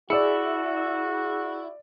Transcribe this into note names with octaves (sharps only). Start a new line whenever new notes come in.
E4 F#4 G#4 D5 E6 C#7